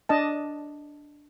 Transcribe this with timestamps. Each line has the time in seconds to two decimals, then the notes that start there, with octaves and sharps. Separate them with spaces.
0.09 D4 D#5 A5